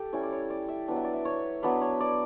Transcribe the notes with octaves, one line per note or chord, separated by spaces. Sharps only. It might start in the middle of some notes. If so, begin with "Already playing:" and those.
Already playing: G4 A4
G3 C#4 E4
D5
C#5
D5
E5
F#3 B3 D4
E5
D5
E5
C#5
F#3 B3 D4 B4
C#5
D5